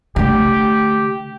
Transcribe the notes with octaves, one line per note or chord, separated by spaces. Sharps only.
D3 A3 G4